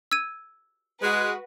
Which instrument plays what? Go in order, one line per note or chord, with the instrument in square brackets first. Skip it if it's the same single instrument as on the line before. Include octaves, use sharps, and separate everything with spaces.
[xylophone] E6 G#6 D#7
[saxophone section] G#3 [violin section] F#4 B4 [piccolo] F#6